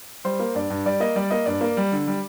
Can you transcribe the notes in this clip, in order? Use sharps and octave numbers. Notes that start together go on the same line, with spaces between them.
G3 C5
A#3
G2 D5
G2
G3 D5
A#3 D#5
G3 D5
A#3 D#5
G2 D5
A#3
G3
D3
G3